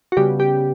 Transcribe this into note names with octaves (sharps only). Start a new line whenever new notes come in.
F#4
C#3 G3 B3 G4
G4